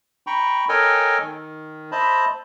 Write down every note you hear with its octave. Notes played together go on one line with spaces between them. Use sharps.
G5 A#5 B5 C#6
A4 A#4 C#5 D#5 G5 G#5
D#3
C5 D#5 E5 A5 B5